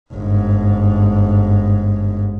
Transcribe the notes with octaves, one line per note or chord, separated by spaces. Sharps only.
G1 G#2